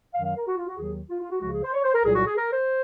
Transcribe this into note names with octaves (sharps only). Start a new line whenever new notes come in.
F#2 D#3 F#3 F5
F5
A#4
F#4
F4
F#4
D#2 D#3 F#3 G#4
F4
F4
F#4
C#2 C#3 F3 G#3 F#4
G#4
C5
C#5
C5
A#4
C2 A#2 F#3 G#4
F#4
G#4
A#4
C5